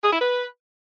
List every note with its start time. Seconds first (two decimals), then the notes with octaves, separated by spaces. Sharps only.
0.03 G#4
0.12 E4
0.21 B4